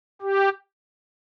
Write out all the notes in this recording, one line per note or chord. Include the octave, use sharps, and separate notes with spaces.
G4